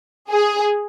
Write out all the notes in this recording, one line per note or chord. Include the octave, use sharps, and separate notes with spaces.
G#4